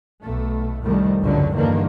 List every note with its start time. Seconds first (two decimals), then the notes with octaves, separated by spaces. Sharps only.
0.22 B1 A3
0.84 C2 F2 D#3 G3 A3
1.21 G#1 C#2 F#2 A2 D3 F#3
1.55 E2 G2 D3 D#3 F3 A#3